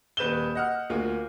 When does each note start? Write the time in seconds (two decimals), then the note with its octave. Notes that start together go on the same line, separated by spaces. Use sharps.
0.17 D#1 B4 G6 E7 G7
0.55 D#5 F#5 F6
0.90 D2 A#3 F4